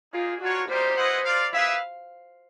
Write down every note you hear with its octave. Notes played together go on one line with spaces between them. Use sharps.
A#3 D#4 F4 G#4
D4 F4 F#4 A#4 C#5
G3 A#3 D#4 G4 C5
E4 G#4 B4 D#5 F#5
F4 A#4 D5 F5
E4 G#4 B4 E5 F5